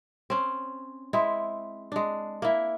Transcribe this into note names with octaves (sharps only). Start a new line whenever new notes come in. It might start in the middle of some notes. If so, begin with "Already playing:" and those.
C4 C#4
G#3 C4 E4
G#3 D4
A#3 E4